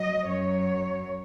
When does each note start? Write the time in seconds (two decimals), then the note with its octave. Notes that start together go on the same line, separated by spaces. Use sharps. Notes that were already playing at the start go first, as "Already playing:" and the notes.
Already playing: F#3 D#5
0.27 F#2 F#3 C#5